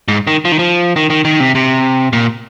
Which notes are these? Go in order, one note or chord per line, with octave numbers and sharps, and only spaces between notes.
G#2
D#3
F3
D#3
F3
D#3
D#3
D#3
C3
C3
A#2